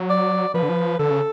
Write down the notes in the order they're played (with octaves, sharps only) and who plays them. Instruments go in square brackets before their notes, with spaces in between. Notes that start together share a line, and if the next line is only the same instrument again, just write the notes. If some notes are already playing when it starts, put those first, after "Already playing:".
Already playing: [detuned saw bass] F#3
[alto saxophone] D5
[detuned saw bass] F3 [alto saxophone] B4
[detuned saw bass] D3
F3
[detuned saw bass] D3 [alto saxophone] A4
[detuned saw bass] C#3